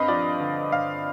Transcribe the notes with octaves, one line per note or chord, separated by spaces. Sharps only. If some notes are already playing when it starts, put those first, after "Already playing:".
Already playing: G2 C4 B4 D#5 F5
F3 D5
D3
G2 F5